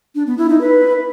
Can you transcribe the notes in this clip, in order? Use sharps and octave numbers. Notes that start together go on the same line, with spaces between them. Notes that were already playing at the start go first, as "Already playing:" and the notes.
D4
B3
E4
D#4
B4